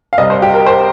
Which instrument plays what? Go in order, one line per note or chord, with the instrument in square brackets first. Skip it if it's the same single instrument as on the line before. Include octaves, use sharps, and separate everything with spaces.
[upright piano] F5
C2 C3 G3 D#5
C5
G4
A#4
C5